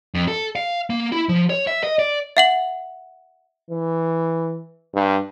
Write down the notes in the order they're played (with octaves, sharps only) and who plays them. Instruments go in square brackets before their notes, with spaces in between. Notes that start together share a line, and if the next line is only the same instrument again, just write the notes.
[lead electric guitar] F2
A4
F5
A#3
E4
F3
C#5
E5
D#5
D5
[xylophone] E5 F#5 F#7
[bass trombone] E3
G2